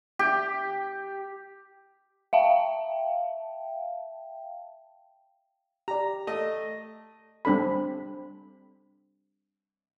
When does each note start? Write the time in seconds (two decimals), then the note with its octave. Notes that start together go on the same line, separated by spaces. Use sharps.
0.19 G4
2.33 E5 F5 G5 A5
5.88 G4 D5 A#5
6.27 A3 D#5
7.45 G3 C4 D4 A4 B5